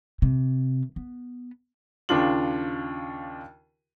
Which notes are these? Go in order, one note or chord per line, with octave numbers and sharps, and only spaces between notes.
C3
B3
D#2 C#3 D4 F4 F#7